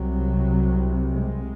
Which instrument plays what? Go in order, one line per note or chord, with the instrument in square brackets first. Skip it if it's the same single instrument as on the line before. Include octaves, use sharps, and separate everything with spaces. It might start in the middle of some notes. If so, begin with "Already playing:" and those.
Already playing: [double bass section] C2 C3 F#3
G#3